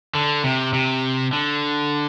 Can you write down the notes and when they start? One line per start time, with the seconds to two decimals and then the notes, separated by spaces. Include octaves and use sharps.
0.15 D3
0.44 C3
0.73 C3
1.33 D3